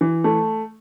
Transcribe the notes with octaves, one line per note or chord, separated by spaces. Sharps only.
E3
A3